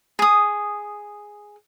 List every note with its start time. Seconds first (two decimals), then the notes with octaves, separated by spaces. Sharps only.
0.19 G#4 D#6